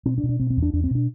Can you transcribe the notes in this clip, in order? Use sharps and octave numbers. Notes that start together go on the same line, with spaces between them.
B2 C4
D4
B2
D4
B2 C4
C4
E2
D4
E2 D4
C4
B2 D4